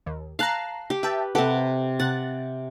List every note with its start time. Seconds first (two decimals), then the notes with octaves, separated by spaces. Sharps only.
0.06 D#2
0.39 F5 A5 A#5 F#6 C7
0.90 G4
1.03 B4 E5 G5 A5
1.35 C3 G4 A4 B4 F#5
1.99 C3 F#5 F#6 A6